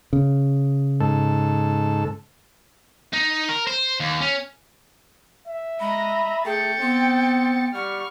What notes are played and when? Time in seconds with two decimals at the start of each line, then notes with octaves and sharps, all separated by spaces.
0.13 C#3
1.01 G#2 A4
3.13 D#4
3.49 A#4
3.67 C5
4.00 D#2
4.21 C#4
5.48 E5
5.80 G#3 D#5 A#5 B5
6.45 A3 G#4 G5 A6 C#7
6.80 B3 C4
7.74 G3 F#5 C#6 F6